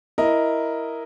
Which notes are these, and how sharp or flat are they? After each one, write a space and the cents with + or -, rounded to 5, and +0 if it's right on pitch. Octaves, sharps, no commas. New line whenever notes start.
E4 +0 A#4 +0 D#5 +0